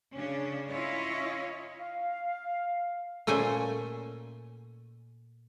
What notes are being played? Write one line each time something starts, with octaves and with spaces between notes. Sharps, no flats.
C#3 C#4 D4
C#4 E4 F4 C#5 D#5
F5
A#2 A3 C#4 C5 G#5